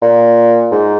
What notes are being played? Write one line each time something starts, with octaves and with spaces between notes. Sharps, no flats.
A#2
G#2